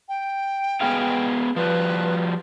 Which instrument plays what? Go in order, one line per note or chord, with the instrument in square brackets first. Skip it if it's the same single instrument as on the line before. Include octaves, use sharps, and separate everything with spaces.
[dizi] G5
[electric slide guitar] B3 G#4 F5
[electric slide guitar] F3 G3 [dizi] B4